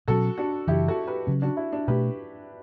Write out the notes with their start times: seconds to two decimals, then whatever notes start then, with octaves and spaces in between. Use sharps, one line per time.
0.08 B2 F#3 C#4 F#4 A4
0.38 D4 F#4
0.67 F#2 C#3 E3 E4 G4
0.88 F#4 A4
1.07 G4 B4
1.27 C#3 F#3 C#4
1.42 D4 F#4
1.57 E4
1.73 D4
1.88 B2 A3 D4 G4 B4